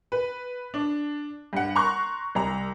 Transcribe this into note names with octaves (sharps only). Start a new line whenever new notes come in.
B4
D4
G2 F#5
A#5 C6 C#6 F#6
C2 A#5